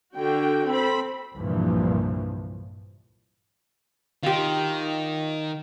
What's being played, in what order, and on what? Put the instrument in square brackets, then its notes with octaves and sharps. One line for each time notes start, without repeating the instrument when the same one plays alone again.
[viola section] D3 F#4 G5
C4 A4 C5 B5
[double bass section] C2 G2 A#2 E3 F3
[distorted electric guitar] D#3 [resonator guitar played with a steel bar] F4 G4